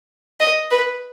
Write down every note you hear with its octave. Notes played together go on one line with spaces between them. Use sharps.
D#5
B4